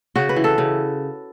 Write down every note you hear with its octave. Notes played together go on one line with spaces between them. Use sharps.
C#3 F#4
B4
E3
A4
C#3